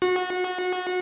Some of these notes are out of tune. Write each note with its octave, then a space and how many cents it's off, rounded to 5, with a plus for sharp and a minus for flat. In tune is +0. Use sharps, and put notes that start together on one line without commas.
F#4 -25